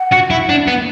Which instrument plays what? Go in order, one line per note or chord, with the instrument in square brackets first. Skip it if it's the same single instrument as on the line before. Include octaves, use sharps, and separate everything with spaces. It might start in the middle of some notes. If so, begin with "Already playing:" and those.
Already playing: [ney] F#5
[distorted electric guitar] F#4
E4
D4
B3